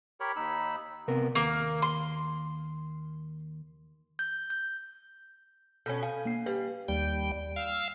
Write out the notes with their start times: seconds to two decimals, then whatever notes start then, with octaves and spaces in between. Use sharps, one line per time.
0.20 G4 A#4 C#5 B5
0.36 D#2 D#4 B5 E6
1.08 C3 B3 A#4
1.35 D#2 A#3
1.82 C6
4.19 G6
4.50 G6
5.86 B2 C#4 A4 B5 G6
6.03 F5 G#5
6.25 A#3 C7
6.46 G3 B4
6.88 D#2 G3 G5
7.56 F5 E6 F6